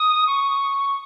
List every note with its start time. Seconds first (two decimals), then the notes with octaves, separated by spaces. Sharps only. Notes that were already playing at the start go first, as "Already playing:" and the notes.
Already playing: D#6
0.27 C#6